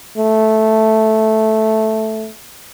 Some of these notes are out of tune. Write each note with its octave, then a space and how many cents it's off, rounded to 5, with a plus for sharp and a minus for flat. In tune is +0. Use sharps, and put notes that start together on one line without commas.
A3 -5